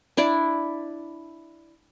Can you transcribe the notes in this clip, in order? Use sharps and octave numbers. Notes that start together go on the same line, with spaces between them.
D4 E4 D5